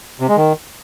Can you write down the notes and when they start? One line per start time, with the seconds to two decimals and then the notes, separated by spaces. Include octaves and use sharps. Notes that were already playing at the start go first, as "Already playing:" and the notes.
0.20 C3
0.28 G#3
0.37 D#3